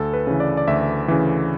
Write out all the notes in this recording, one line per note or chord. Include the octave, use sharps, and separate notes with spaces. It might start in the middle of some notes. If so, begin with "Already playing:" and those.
Already playing: D2 A4
B4
C#3 E3
D5
D5
D2 E5
C#3 E3